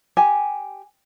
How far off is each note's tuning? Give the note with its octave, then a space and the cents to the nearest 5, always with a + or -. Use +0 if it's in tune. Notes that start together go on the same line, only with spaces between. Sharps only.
G4 +0 G#5 +0